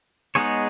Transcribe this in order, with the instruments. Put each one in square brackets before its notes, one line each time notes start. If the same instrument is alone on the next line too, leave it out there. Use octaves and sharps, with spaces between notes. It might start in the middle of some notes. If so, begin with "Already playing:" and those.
[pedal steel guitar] G#3 B3 D#4 G#4 C#5